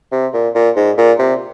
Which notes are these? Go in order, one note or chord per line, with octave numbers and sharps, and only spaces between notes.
C3
A#2
A#2
G#2
A#2
C3